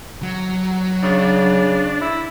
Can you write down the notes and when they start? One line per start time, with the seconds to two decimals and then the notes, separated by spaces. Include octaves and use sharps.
0.23 F#3
1.03 C#3 D4
2.01 E4